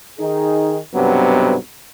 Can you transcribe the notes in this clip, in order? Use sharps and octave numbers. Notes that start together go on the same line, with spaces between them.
D#3 D#4 G#4
B1 G2 C3 F#3 B3